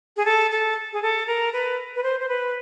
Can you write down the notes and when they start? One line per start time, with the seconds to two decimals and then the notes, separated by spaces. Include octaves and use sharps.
0.17 G#4
0.25 A4
0.51 A4
0.93 G#4
1.03 A4
1.27 A#4
1.53 B4
1.96 B4
2.03 C5
2.20 C5
2.29 B4